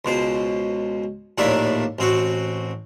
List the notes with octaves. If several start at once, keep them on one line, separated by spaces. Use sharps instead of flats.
C#2 B2 C5
A#1 D#2 A2 A#3 D4 E5
A1 C4 F#4